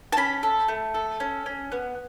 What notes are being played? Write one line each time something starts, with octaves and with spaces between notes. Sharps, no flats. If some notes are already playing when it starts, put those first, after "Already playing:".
A5
C#4 B5
A4
A3
A4
C#4
C#4
B3